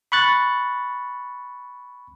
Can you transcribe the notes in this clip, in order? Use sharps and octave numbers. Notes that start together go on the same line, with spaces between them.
B5 C#6 F#6 A6